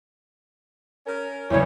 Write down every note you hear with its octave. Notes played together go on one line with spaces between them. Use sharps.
C#4 A#4
F#1 E2 G3 E4 C#5